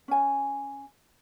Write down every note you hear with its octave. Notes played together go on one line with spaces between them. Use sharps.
C#4 G#5